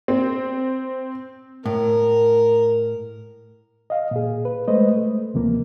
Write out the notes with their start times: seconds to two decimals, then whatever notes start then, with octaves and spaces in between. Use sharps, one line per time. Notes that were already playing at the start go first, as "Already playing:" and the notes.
0.08 C4
1.66 A2 A#4
3.90 D#5 F5
4.11 A#2 G#4
4.45 B4
4.68 G#3 A3 B4 C5 D#5
4.91 A3
5.34 D2 C3 F3 A#3